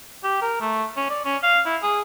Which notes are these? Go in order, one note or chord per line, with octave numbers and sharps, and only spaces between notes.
G4
A#4
A3
C#4
D5
C#4
F5
E4
G#4